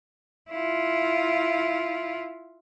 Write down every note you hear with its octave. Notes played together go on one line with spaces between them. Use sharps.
E4 F4